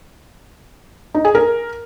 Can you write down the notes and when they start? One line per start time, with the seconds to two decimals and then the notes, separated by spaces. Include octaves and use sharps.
1.14 D#4
1.25 G#4
1.35 A#4